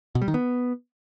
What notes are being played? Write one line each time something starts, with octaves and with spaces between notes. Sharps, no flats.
B2
G3
D#3
B3